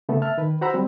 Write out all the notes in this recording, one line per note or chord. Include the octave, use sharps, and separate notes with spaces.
C#3 A3 B3 A4
E5 A5 F6
D#3 B4
F#4 C5 F#5 A#5 B5 E6
F#3 G3 C4